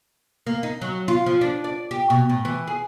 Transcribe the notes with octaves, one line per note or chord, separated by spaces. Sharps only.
A#3
D#4
F#3
F4
F3
D4
D5
G4
B2
A2
E3
G#4